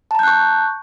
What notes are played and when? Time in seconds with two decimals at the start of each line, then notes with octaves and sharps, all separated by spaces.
0.11 A5
0.15 A#5
0.19 G6
0.23 F#6
0.27 C#6